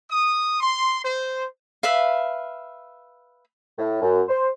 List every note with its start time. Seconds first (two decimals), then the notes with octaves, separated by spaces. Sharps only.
0.10 D#6
0.60 C6
1.03 C5
1.83 B4 E5 F5
3.78 A2
4.02 F#2
4.29 C5